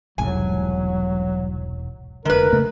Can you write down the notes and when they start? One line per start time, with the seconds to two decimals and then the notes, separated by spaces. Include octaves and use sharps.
0.18 E1 C2 G#2 F#3 G#5
2.25 F1 D3 G#3 A#4 B4
2.53 C#3 A3 A#3